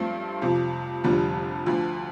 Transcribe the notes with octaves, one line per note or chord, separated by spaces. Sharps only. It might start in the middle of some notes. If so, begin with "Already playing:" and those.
Already playing: G2 F3 A3 C4
F2 C3 F3
F1 F2 D3 G3
D2 D3 F3